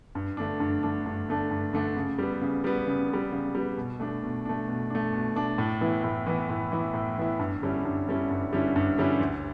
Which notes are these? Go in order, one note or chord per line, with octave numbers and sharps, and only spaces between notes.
G2
D3 A3 D4
G2
D3 A3 D4
G2
D3 A3 D4
G2
D3 A3 D4
C#3
G3 B3
C#3
G3 B3
C#3
G3 B3
C#3
G3 B3
B2
A3 D4
B2
A3 D4
B2
A3 D4
B2
A3 D4
A2
E3 B3 E4
A2
E3 B3 E4
A2
E3 B3 E4
A2
E3 B3 E4
G2
D3 G3 C#4 E4
G2
D3 G3 C#4 E4
G2
D3 G3 C#4 E4
G2
D3 G3 C#4 E4
D2